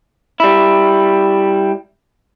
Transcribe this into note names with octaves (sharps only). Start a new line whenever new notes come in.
G3 E4